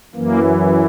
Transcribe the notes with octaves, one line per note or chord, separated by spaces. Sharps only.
F#2 E3 A#3